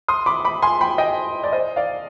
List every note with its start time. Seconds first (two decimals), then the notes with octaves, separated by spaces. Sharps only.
0.08 C6 D#6
0.26 B5 D6
0.44 B5 D6
0.62 G#5 C6
0.81 G5 B5
0.98 D#5 G5
1.44 D5
1.53 C5 D#5
1.76 D5 F5